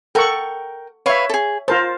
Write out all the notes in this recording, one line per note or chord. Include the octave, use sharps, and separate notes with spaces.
A4 A#4 F#5 G5 C#6
B4 C#5 E5 F5 C#6
G#4 A4
F4 A#4 C5 A5